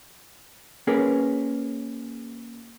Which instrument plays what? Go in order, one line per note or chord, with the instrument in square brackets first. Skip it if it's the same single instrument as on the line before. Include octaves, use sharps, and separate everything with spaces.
[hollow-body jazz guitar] A#3 C#4 G#4 A#4 B4